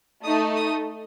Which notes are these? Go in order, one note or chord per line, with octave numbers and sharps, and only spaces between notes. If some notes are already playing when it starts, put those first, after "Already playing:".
A3 D#4 A4 D#6
D#6